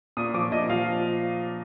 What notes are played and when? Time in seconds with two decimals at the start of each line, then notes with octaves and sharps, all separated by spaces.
0.17 A#2 D#6
0.34 F3 D6
0.51 A#2 D#5
0.69 F3 F5